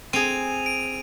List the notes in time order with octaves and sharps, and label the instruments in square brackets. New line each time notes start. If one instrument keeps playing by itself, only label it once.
[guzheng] C4 G#4 [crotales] D#7 F7
[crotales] D7